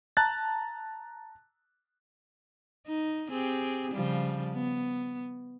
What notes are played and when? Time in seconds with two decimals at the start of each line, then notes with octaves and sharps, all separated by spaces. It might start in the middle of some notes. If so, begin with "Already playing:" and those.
0.17 A5 A#5 F#6 A6
2.87 D#4
3.30 C4 G4 G#4
3.92 C#3 F3 G3
4.54 B3